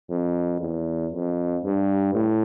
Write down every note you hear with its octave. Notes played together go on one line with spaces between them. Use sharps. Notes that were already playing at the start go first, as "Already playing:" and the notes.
F2
E2
F2
G2
A2